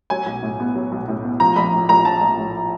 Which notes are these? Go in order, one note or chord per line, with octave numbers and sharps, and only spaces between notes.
F#3 G#5
B1
A2
B3
F#3
B1
A2
B3
F3 A#5
A#1 B5
A2
A#1 A#5
F3 A5
A#1
A2